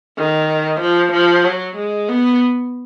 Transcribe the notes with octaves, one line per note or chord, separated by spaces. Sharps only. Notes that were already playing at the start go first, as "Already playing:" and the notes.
D#3
F3
F3
F#3
G#3
B3